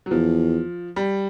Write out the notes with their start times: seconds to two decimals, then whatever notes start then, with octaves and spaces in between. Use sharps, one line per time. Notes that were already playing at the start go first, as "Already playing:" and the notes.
0.06 F#3
0.11 E2 F3
0.96 G3